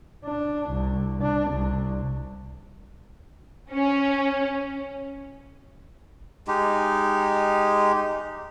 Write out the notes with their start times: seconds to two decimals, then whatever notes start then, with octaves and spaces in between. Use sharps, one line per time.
0.25 D4
0.70 C2
1.23 D4
1.51 C2
3.71 C#4
6.48 G#3 D#4 G4